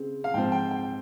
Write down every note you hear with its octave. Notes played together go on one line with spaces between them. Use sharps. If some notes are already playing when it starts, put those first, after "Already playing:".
Already playing: C#3 C4
F5
G#2 F3 C4 G5
G5
G5